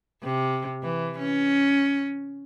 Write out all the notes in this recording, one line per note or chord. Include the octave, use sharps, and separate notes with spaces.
C3
E3
C#4